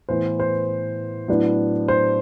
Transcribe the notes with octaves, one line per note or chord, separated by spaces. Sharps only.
A2 E3 B3 C5
C5
A2 F#3 B3 D4
C5